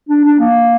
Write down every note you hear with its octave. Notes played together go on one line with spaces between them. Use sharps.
D4
D4
A#3